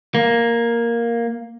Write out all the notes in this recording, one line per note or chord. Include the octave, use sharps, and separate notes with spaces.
A#3